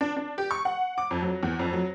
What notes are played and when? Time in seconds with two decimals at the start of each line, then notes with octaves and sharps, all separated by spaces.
0.01 D4
0.17 D4
0.38 G4
0.51 C#6
0.65 F#5
0.98 D6
1.11 F2
1.22 F#3
1.43 E2
1.59 F2
1.73 F#3